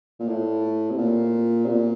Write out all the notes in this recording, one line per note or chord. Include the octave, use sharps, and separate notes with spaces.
A#2
A2
C3
A#2
C3
A#2